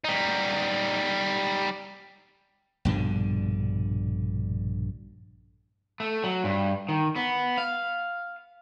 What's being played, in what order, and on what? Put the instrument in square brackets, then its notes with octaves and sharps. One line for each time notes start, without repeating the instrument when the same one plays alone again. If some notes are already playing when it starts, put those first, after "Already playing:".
[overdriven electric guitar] G3 D#4
[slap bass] A#1 G2 B2 D3
[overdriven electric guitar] A3
F#3
G2
D#3
B3
F5